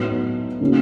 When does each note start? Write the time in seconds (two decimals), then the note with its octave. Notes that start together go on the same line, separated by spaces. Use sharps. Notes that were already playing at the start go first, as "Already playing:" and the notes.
Already playing: A2 F#3 B3 D#4
0.61 C#3 F#3 A#3 C#4